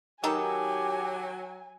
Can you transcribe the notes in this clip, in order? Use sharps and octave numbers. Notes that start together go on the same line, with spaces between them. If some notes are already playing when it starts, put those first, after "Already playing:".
D#3 F#3 D#4 G4 A4 G#5